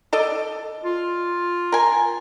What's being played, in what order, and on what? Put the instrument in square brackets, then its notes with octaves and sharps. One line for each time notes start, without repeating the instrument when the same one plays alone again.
[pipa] A4 D5 D#5
[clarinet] F4
[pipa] A#4 G#5